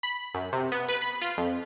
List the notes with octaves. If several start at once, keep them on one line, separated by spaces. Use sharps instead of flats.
B5
F#2
C3
B3
B4
B5
F4
F2